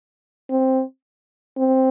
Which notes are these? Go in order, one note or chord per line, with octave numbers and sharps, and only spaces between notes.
C4
C4